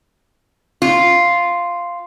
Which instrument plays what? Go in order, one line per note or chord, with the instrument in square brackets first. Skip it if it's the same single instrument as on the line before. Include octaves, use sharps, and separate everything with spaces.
[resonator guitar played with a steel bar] F4